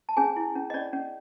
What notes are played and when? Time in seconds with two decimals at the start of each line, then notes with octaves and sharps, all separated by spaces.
0.09 A5
0.17 C#4 G#4 G#5
0.36 E4
0.55 C#4
0.70 D#5
0.74 C#4 D5
0.93 C#4